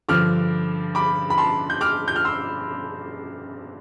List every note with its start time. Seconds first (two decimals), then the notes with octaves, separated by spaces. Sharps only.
0.08 G2 D3 F3 D6 F6
0.95 B5 D6
1.30 B5
1.38 A5 C6
1.70 G6
1.81 D6 F6
2.08 G6
2.16 F6
2.25 C6 E6